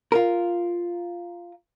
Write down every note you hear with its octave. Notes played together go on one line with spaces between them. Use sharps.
F4 A#4